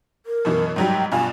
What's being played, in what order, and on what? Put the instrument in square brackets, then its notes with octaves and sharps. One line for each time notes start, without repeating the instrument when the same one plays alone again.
[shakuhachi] A#4
[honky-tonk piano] F#2 B2 E3
[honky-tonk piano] G#2 F#3 G3 [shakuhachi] G5
[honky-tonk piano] G2 B2 F4 [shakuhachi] G#5